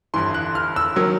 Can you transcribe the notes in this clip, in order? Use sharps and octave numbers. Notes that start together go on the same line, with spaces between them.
G1 G2 E3 C6
F#6
F6
E6
D#3 F#3